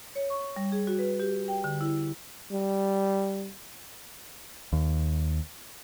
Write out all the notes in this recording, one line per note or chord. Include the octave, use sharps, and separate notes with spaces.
C#5
C#6
G3
G#4
F#4
B4
G4
G5
D3
E4
G3
D#2